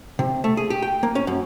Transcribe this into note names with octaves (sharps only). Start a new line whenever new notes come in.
C3
A3
G#4
G4
G5
A#3
C#4
F#2